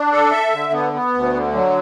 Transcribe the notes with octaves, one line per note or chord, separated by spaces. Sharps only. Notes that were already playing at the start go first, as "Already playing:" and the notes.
Already playing: D4
A4
E5
D3
B3
B3
D2
D3
F#3